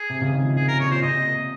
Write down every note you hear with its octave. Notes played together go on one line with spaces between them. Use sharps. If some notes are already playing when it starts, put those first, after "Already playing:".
Already playing: G#4
C3
C#3
D#3
F3
C#3 G#4
C3 A#4
A#2 C#5
A#2 C5
C3 D#5
A#3